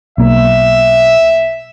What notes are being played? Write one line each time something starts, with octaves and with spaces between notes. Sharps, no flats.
B1 A#3 E5